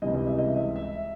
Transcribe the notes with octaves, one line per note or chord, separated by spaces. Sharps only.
C#2 C3 E3 G3 D#5
D#5
E5
D#5
E5
E5